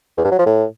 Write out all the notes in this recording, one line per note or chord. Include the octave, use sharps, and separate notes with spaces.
E2
G2
F#3
F3
A2